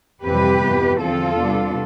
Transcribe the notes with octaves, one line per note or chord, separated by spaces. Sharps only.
F2 C3 E3 G3 C4 G4 B4
F2 E3 B3
E2 D3 F3 C4 F4 A4
C3 G3 B3 D4